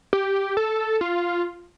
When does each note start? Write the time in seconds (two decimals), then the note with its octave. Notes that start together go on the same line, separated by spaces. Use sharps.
0.13 G4
0.57 A4
1.01 F4